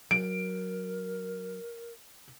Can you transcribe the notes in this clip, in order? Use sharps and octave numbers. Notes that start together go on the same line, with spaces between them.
F#3 A#4 D7